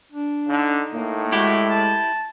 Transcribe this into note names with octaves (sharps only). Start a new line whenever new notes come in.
D4
D3 D#4
A2 A#3
G#3 E4 F#4 G4
A5